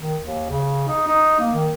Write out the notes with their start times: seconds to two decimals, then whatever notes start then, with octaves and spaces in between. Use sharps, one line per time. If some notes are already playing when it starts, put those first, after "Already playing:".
0.01 D#3
0.22 D#2
0.50 C#3
0.88 D#4
1.07 D#4
1.40 A#3
1.54 D#3